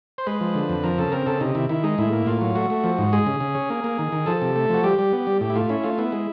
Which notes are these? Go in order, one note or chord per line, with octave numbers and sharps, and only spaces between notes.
C5
G#3 B4
F3
D3
F2
F3 A#4
C#3 A4
C4 A#4
C#3 A4
C3 D#4
D#3 E4
D#3 E4
G#3 D#4
A2 E4
A#3
A2 F4
F#3
A3 F#4
A3
F3
G#2
G#3 G#4
C#3
C#3
C#4
A#3
A#3
D#3
D#3
F3 A4
C3
A3
F3 F#4
G3 G4
G3
B3
G3
A2 G4
E4
A3 F4
C#4 E4
A3 F4
B3 E4
G#3